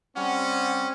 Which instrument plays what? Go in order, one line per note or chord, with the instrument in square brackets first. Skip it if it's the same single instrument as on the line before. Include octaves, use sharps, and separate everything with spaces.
[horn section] G3 C4 C#4 [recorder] F#5